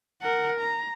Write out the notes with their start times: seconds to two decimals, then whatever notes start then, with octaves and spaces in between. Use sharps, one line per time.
0.22 A#4 F#5
0.60 A#5